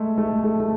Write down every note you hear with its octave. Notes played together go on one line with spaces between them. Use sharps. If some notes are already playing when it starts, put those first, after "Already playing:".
Already playing: G#3 A3
A3
A3
A3